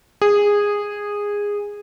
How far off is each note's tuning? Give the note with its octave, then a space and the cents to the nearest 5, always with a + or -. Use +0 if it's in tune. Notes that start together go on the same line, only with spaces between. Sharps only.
G#4 -15